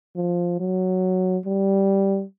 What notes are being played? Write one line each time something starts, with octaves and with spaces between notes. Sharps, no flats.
F3
F#3
G3